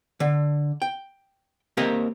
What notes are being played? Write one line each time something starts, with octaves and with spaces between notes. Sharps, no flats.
D3
G5
A#3 C4 G4 A#4 D#5